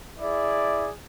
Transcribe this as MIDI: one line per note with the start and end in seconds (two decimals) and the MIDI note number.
0.19 0.89 64
0.19 0.89 68
0.19 0.89 74